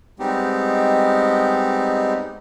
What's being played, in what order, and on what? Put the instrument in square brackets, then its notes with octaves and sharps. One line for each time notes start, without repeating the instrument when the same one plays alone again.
[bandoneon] G3 G#3 B3 C4 D#4 G4